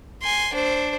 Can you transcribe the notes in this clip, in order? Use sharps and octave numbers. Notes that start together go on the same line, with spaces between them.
G#5 C6
D4 C5